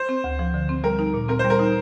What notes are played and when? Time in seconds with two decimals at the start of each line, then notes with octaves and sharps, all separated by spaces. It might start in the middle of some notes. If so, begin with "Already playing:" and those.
Already playing: C5
0.09 C4
0.24 D2
0.39 F3
0.54 D3
0.69 C4
0.84 G3 A#4
0.99 D#4
1.14 A#2
1.28 C4 A#4
1.39 C5
1.44 G3
1.50 A#4
1.59 D#4